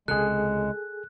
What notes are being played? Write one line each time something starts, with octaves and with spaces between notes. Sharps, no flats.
C#2 C3 G#3 G#4 A4 F#6